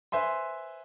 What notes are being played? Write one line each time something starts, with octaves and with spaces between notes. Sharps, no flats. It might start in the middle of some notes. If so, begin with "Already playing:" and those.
B4 C5 E5 G#5 C6